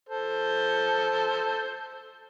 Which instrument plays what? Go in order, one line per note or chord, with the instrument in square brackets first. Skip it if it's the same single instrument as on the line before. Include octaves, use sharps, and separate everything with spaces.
[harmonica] A4 C5